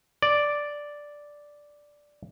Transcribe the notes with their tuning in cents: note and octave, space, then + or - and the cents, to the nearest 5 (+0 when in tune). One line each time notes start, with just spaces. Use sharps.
D5 +0